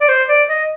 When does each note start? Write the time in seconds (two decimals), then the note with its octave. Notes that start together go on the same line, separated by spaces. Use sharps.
0.01 D5
0.08 C5
0.28 D5
0.49 D#5